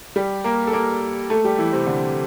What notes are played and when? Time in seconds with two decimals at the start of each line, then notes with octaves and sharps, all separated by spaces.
0.16 G3 G4
0.44 A#3 A#4
0.67 A4
0.73 A#3 A#4
1.30 A3 A4
1.44 G3 G4
1.58 E3 E4
1.72 C3 C4
1.87 D3